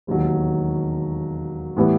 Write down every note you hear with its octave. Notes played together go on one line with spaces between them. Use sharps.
E1 D#2 D#3 F#3
A2 E3 G3 B3